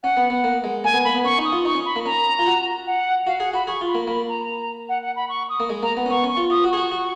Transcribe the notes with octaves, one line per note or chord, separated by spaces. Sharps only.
C#4 F#5
B3
B3
A#3
G#3
A#3 G#5
B3
A#3 B5
B3
C#4 C#6
D#4
D#6
F4
D#4 C#6
C#4
B5
A#3
C#4 A#5
F4
F#4
F#5
F#4 F5
G#4 F#5
F#4 B5
G#4 C#6
F4
B5
A#3
A#3 B5
A#5
F#5
F#5
B5
C#6
D#6
A#3
G#3
A#3 A#5
B3
C#4
B3 C#6
C#4
C#6
F4
F4 D#6
F#4
G#4 C#6
F#4
F#4